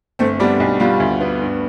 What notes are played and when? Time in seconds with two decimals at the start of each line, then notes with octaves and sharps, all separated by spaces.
0.19 G1 A3 C4
0.40 G3 B3 D4
0.60 B1
0.80 G3 B3 F4
1.00 D2
1.21 B3
1.41 G2